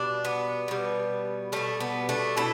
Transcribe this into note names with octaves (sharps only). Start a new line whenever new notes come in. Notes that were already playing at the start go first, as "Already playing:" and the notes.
Already playing: B2 G3 D4
B3
B2 G3
B2 G3 A3
B3
A3 D4
B2 E4 A4